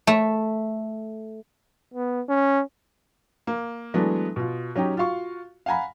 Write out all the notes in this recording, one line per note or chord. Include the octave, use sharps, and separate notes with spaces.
A3
B3
C#4
A#3
E3 F#3 G#3 A3 B3 D4
B2 F4
F#3 C#4 D#4 G4
F4 F#4 F5 C#6
F5 F#5 G#5 A#5 B5